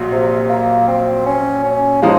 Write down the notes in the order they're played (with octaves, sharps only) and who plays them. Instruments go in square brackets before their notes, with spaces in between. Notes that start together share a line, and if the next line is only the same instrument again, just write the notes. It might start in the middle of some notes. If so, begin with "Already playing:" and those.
Already playing: [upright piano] A#1 A#2 F#3
[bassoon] C3
A#3
C4
C#4
C#4
[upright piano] F3 G#3 D#4 [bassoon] A#3